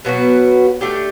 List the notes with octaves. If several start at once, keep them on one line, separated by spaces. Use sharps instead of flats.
B2 F#3 B3 F#4
A3 D4 G4